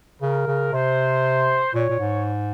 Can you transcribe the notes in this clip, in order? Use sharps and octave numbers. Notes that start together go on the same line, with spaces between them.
C#3 A#4
C#3
C3 C5
A#2 C#5
A#2
G#2